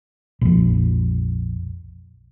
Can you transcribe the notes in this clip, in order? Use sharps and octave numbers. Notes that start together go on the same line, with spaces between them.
A#1 F2